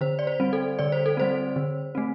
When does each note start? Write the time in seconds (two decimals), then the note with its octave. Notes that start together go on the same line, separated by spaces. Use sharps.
0.01 D3 C5
0.19 D5
0.27 C5
0.40 G3 C4
0.53 A4
0.79 D3 D5
0.92 C5
1.06 A4
1.17 G3 C4 C5
1.56 D3
1.95 A3 C4